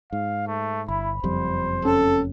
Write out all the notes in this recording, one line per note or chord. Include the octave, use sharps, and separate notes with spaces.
G#2 F5
A3
G1 E4 B5
F#1 F2 G3 C5
C#4 A4